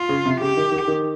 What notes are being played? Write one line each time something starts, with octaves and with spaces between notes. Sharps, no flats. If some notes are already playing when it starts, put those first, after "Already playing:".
Already playing: F4
C#3
C3
C#3 G4
D#3
D#3
D#3